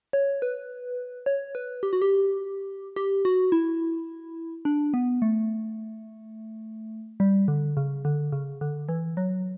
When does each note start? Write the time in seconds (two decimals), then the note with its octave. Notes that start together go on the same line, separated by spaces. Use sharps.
0.13 C#5
0.42 B4
1.26 C#5
1.55 B4
1.83 G4
1.93 F#4
2.02 G4
2.96 G4
3.25 F#4
3.52 E4
4.65 D4
4.94 B3
5.22 A3
7.20 G3
7.48 D3
7.77 C#3
8.05 D3
8.32 C#3
8.61 D3
8.89 E3
9.17 F#3